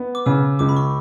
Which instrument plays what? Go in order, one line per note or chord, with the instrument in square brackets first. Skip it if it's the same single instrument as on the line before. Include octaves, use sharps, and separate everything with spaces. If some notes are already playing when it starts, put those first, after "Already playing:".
Already playing: [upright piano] B3
[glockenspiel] D6
[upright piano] C#3 [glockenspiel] E6
[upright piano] C#2 [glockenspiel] D6
[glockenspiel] B5
C#6